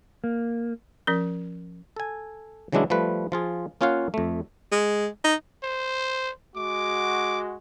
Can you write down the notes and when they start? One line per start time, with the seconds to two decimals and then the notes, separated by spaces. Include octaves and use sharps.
0.24 A#3
1.07 F3 C#4 A#4
1.96 A4 G#5
2.72 C#3 E3 F#3 G#3 D4 E4
2.90 F3 G3 A3 B4
3.32 F3 F4 G#4
3.81 A#3 C#4 F4 C#5 F5 F#5
4.14 F2 A3
4.72 G#3
5.24 D#4
5.63 C5
6.56 G#3 F#4 D6